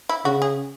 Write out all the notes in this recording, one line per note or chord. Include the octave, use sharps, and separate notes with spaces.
E4
C#3 F#4
G#4